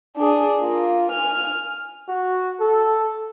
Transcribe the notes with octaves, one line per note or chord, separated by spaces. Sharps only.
D4 G#4
A#3 F4
G#5 F6
F#4
A4